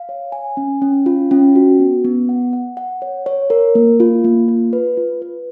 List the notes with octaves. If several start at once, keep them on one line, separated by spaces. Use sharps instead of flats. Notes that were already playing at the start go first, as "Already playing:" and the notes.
Already playing: F5
C#5
G#5
C#4
C#4
F4
C#4
F#4
B3
B3
F#5
F#5
F#5
C#5
C#5
A#4
A#3
F4
A#3
F4
B4
F4
B4